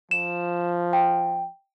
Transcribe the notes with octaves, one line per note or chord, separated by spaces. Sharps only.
F3 E7
G5